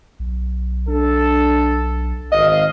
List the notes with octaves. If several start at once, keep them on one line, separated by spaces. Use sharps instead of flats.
B1
D4 A4
G#1 D#5 F5